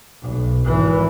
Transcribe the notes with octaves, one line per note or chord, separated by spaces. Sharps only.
B1
G#1 E3